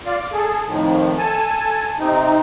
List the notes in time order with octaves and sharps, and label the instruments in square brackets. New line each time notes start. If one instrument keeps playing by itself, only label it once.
[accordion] F4 D5 F5
D6
G#4 A4
F2 A2 D#3 F3
A4 G#5 A5
C3 C4 D#4